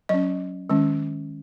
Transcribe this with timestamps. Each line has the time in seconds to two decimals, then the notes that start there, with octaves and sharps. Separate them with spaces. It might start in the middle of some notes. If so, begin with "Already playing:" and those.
0.09 F#3 C#4 D#5
0.70 D#3 G#3 C#4